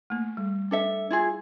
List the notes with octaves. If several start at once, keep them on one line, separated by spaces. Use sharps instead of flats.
A3 A#3
G3
D4 A4 E5
E4 F4 G#4